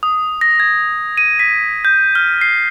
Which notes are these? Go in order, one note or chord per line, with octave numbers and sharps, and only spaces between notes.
D#6
A#6
G#6
D#7
B6
G6
F6
C7